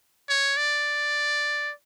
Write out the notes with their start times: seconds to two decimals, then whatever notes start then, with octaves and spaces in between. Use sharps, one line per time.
0.29 C#5
0.57 D5